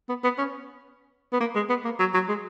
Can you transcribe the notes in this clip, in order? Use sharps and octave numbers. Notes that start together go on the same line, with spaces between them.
B3
B3
C#4
B3
A#3
G#3
B3
A#3
F#3
F#3
G#3